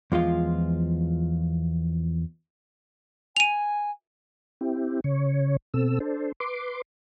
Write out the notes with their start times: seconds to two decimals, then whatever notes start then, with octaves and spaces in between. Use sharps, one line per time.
0.12 E2 F3 G#3 F4
3.36 G#5 D#7 F7
4.61 C4 E4 G4
5.04 C#3 C#5
5.74 B2 C4 A4 E6
6.00 D4 A4 C5
6.40 B4 C6 D6